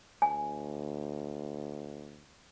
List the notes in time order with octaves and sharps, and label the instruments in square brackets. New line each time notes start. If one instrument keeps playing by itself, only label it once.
[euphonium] D2 [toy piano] G#5